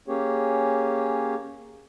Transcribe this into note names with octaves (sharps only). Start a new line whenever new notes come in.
A#3 C#4 G4 G#4 C#5